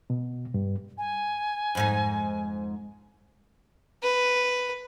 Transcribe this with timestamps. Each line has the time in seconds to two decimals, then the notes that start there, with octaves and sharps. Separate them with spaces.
0.10 B2
0.54 G2
0.98 G#5
1.75 F2 G#2 D#4
4.03 B4